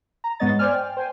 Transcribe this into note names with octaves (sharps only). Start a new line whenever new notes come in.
A#5
G#2 G#3 B3 C#5 D#5 A6
C5 D5 G#5 F6
G5
C5 G5 G#5